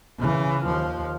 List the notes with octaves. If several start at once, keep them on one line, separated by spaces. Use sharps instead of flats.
C#3 E3
D#2 F3